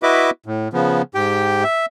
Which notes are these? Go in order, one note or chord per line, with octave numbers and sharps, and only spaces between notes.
E4 F#4 B4 D#5 E5 D6
A2
C#3 F3 B3
G#2 G4 G5
E5